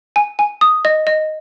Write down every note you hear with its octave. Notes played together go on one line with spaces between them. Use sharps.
G#5
G#5
D#6
D#5
D#5